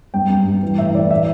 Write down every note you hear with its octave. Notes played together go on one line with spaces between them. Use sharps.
G2 G5
G2
G2
E3
A2 E5
A2 D5
E3 E5